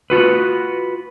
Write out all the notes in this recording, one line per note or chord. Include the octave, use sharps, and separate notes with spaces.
F4 F#4 B4